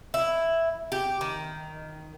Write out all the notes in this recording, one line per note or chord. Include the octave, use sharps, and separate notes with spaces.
E4
G4
D#3